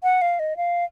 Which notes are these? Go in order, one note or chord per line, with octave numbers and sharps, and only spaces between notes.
F#5
F5
D#5
F5